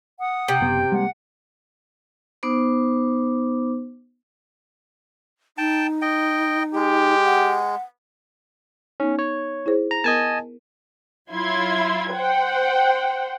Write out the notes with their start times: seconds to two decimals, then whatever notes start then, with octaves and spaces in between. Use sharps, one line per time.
0.20 F#5 D#6
0.48 C3 G5
0.61 F#1 B3
0.92 G3 G#3 A#3 F#5
2.43 B3 D#4 C5 D6
5.58 D#4 G5 A5
6.02 D#5 G5
6.75 G#3 G4
7.25 F#5
9.00 B3 C#4 D#4
9.19 C#5
9.66 E4 G#4 C5
9.91 A#5
10.04 B3 A#4 D#5 G#5 A5 A6
11.31 F#3 E4 F4 C6 G#6
12.13 C5 F#5 G5